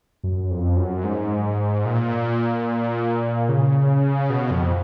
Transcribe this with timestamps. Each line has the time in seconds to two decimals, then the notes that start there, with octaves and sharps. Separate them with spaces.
0.23 F#2
0.51 F2
0.77 F#2
1.04 G#2
1.85 A#2
3.49 C#3
4.30 B2
4.51 F2